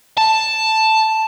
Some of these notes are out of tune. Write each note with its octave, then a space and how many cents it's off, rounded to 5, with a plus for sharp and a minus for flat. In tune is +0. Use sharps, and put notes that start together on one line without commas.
A5 +5